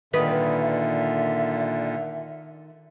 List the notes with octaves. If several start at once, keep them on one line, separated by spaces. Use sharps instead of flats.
A#2 D3 D#3 B4 E5